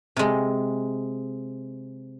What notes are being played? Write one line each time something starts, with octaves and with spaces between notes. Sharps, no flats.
C3 G#3